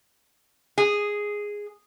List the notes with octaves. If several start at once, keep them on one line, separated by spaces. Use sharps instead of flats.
G#4